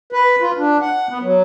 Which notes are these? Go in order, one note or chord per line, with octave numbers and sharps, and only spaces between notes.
B4
F4
D4
F#5
B3
F#3